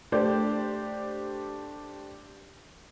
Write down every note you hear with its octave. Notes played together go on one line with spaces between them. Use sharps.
A3 D4 G4 C5 D5